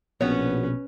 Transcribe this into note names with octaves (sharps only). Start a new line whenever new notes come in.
A#1 B2 B3 C#4 B4 C#5